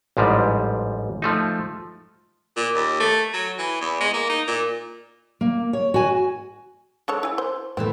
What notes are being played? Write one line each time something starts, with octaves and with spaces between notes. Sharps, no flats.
A1 G#2 F3 G3 G#3
F3 A3 D#4
A#2
D#2
A3
F#3
E3
E2
G#3
A#3
D#4
A#2
A#3
C#5
F#4 G#5
G#3 A4 C#5
E4 G#5
C5
A2 E3 A3 C4